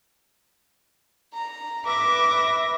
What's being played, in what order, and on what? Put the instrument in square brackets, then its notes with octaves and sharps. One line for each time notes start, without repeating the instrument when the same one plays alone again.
[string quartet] A#5
B4 E5 D6 A#6